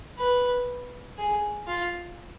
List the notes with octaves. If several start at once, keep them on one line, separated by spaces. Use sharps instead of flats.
B4
G#4
F4